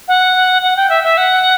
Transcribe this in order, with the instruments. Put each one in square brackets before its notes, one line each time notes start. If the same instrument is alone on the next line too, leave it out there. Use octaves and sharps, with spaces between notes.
[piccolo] F#5
F#5
G5
E5
E5
F#5